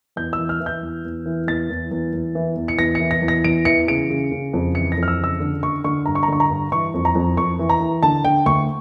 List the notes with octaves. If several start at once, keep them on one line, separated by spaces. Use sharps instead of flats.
E2 G6
E6
E3
F6
E3
G6
E2
E2
E3
E2 A6
E2
E2
E2
E3
E2
C#7
E2 A#6
C#7
E3
A#6
E2
A#6
E2 D7
E3 C#7
C#3 D7
C#3
C#3
F2
E3 C#7
A#6
F2
F6
E6
C#3 E6
D3
D3 C#6
D3 C#6
G2 A#5
C#6
A#5
D3 C#6
A#5
G2
E3 C#6
F2
A#5
F2
F2 C#6
E3
A#5
E3
D3 A5
D3 G5
D2 C#6